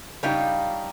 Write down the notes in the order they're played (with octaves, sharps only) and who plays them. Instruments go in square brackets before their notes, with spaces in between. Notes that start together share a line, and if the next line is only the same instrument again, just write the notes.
[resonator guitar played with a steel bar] C#3 G3 D4 D#4 F4 G4